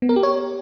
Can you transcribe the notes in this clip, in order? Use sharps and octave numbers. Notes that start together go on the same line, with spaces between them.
B3
A#4
G4
C#5